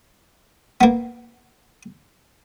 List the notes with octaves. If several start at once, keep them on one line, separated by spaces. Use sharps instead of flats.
A#3 B3